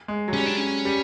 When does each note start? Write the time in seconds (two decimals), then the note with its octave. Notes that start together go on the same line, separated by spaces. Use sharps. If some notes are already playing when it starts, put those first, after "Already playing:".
0.08 G#3
0.28 F#3
0.33 G3 C#4
0.46 D4
0.57 C#4
0.85 G3